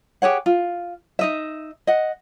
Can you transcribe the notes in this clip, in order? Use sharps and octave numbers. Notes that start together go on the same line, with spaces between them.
G4 G#4 C#5 F#5
F4
D#4 D#5 E5
D#5 F#5